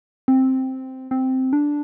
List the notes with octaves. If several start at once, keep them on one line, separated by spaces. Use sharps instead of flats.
C4
C4
D4